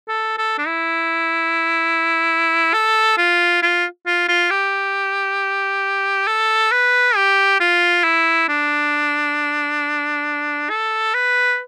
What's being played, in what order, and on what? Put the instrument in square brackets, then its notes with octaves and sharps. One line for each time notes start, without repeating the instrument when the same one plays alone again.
[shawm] A4
A4
D4
E4
A4
F4
F4
F4
F4
G4
A4
B4
G4
F4
E4
D4
A4
B4